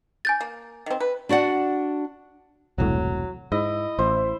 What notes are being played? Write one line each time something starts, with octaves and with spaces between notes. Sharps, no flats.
G#5 G6 A6
A#3
D#3 C4
B4
D4 F#4 D5 F#5
E1 C2 A2 F#3
G#2 E4 D#5
A1 E4 C5